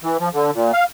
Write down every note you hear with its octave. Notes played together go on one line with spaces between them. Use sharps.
E3
F3
D3
A#2
F5